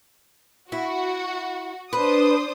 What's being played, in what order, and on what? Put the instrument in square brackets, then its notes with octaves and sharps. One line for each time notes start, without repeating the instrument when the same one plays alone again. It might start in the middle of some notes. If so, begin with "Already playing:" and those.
[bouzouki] E4 [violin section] F#4
[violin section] D4 C5 D#6 [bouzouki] B4